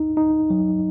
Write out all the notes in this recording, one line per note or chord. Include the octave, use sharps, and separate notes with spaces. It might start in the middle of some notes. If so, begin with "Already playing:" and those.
Already playing: D#4
D#4
F#3